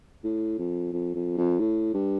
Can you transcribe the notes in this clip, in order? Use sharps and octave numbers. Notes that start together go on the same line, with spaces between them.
A2
F2
F2
F2
F2
A2
G2